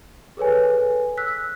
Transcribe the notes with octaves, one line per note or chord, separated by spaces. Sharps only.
G#4 A4 B4 C#5 G#5
E6 F#6 B6